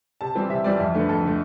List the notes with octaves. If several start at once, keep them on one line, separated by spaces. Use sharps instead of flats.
C3 A5
E3 G3 C4
C3 E5
E3 G3 C4 D5
F2 E5
D3 A3 B4
F2 A4
D3 A3